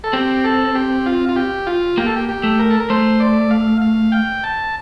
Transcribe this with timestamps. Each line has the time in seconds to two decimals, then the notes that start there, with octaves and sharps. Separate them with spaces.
0.04 A4
0.13 C4 G4
0.44 A4
0.75 G4
1.06 F4
1.29 F4
1.36 G4
1.67 F4
1.97 A#3 G4
2.06 A4
2.16 G4
2.29 G4
2.43 A3
2.59 A#4
2.70 A4
2.80 A#4
2.90 A3 C5
3.20 D5
3.51 F5
3.82 F5
4.12 G5
4.44 A5